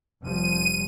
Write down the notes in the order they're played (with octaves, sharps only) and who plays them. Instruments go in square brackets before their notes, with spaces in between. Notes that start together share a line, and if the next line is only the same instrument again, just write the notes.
[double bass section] F1 F3 G3 [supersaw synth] D#7